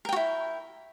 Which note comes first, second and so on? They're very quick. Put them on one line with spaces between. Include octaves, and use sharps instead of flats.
A#4 G5 F#4 E4